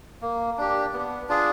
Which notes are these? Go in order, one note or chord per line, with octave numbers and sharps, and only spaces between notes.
A#3
D4 G4
B3
D4 F4 G#4